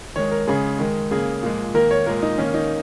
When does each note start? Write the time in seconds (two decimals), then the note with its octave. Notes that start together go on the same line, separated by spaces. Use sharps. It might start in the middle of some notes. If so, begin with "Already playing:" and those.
0.16 D#3 G#3 C#5
0.31 A#4
0.47 C#3 G#3 G#4
0.79 D#3 G#3
1.11 C#3 A#3 G#4
1.43 A#2 F3 G#3
1.74 D#3 A#3 A#4
1.91 C#5
2.06 A#2 G#3 A#4
2.22 D#4
2.38 D#3 A#3 C#4
2.54 D#4